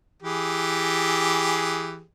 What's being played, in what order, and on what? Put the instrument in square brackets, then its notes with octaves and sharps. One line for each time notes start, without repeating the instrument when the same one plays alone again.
[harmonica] E3 G4 G#4